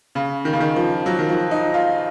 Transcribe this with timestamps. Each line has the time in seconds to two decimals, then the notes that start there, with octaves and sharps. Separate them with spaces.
0.15 C#3
0.45 D#3
0.53 C#3
0.60 D#3
0.76 F3
1.06 F#3
1.19 D#3
1.29 F3
1.51 D#4
1.74 F4